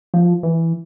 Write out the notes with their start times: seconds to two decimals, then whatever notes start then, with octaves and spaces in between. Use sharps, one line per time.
0.14 F3
0.43 E3